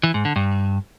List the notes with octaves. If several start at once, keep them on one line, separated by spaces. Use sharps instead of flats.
E3
G#2
D3
G2